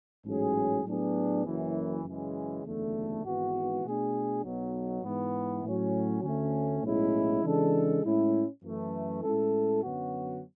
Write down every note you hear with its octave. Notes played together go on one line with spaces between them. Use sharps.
A1 G#2 F#3 C#4 G#4
A2 F#3 B3 D4 G#4
F#1 F#2 E3
F#2 C#3 E3 G#3
F#1 E2 D3 A3
G#1 G#2 E3 B3 F#4
B2 A3 D4 G#4
B1 B2 F#3
G#2 E3 B3
A2 F#3 C#4
D2 D3 A3 C#4
B1 A2 G#3 C#4 E4
C#3 E3 G#3 D4 A4
A2 G#3 C#4 E4
F#2 E3 A3
A2 G#3 C#4 E4 A4
F#2 D3 F#3 B3 F#4